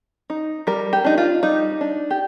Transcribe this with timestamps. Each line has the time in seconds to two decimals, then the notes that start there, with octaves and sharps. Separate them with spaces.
0.30 D#4
0.67 G3 A#4
0.93 G4
1.04 D4 D#4
1.18 F4
1.43 G3 D#4
1.81 D4
2.11 G4